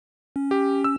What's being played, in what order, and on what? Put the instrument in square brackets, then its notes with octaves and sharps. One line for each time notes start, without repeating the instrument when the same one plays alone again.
[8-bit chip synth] C#4
[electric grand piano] G4
E6